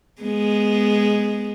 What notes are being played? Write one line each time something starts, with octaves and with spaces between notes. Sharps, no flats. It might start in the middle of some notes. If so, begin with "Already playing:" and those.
G#3 B3